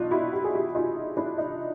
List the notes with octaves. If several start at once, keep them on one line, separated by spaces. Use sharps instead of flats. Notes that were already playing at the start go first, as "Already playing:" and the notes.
Already playing: B2 F#3 D4 D#4 F4 F#4
E4 F#4
G4
G#4
F4 G4
D#4 F4
D4 E4
D#4